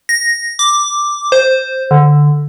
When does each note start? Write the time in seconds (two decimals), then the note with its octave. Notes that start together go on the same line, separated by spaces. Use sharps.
0.09 A#6
0.59 D6
1.32 C5
1.91 D3